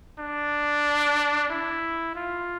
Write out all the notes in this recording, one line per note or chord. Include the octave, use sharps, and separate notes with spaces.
D4
E4
F4